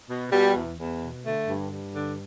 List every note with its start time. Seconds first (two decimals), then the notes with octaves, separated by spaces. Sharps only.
0.09 B2
0.31 B2 G3
0.55 E2
0.79 E2
1.02 B2
1.24 D3 A3
1.48 G2
1.71 G2
1.94 D3